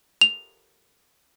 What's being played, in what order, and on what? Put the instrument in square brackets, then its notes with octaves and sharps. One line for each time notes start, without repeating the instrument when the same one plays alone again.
[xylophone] F7